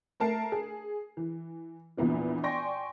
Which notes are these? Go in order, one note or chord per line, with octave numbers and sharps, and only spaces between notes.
A3 A#4 A5 C7
G#4
E3
A#1 E2 A#2 B3 F4
D5 G5 G#5 C6 C#6 A#6